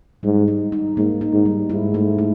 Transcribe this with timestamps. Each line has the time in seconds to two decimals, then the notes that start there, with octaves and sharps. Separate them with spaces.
0.23 G#2 G3
0.48 D#4
0.72 D#4
0.97 G#2 A#3
1.21 D#4
1.33 G#2
1.45 G3
1.70 G#2 E4
1.94 A3
2.18 E4